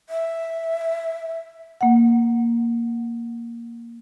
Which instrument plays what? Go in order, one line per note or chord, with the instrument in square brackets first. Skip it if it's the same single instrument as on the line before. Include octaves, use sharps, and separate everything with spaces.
[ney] E5
[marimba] A#3 F#5